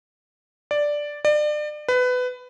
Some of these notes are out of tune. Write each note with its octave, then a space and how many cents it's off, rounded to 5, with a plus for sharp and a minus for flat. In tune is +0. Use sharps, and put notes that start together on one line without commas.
D5 +0
D5 +30
B4 +20